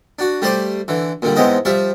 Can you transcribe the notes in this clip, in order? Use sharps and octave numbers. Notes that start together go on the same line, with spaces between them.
D4 F#4
G3 A3 C5 D5 C6 D6
D3 E3
A#2 D3 G3
E2 G#2 B3 C4 D#5 G5
F3 G3 E5 F5